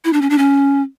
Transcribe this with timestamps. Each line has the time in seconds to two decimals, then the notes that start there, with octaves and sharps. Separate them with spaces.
0.05 E4
0.13 D4
0.22 C#4
0.30 D4
0.38 C#4